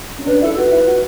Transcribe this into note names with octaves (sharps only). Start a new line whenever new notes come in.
C#4
D4 B4
E4 A4
F#4 B4
E4
F#4